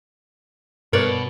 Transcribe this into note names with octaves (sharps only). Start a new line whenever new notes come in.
G2 B2 A#4 B4 C#5 D5